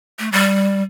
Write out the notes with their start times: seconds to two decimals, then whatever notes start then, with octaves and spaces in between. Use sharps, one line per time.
0.19 A3
0.32 G3